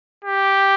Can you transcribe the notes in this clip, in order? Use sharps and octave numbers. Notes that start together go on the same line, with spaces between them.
G4